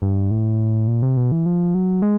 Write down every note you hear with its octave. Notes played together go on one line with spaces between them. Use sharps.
G2
A2
A#2
C3
B2
E3
F3
F#3
G#3